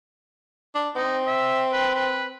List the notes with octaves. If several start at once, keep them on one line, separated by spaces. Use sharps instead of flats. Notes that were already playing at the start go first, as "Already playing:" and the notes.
D4
C4 D#4
E5
B4
B4